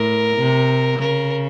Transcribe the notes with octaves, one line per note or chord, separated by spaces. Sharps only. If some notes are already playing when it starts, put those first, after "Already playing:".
Already playing: A2 A#4
C3
C#3 A#4